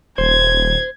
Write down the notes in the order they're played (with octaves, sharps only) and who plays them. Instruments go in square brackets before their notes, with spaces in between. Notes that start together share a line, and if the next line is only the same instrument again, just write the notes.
[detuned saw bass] D#1 [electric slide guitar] C5 [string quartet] G#6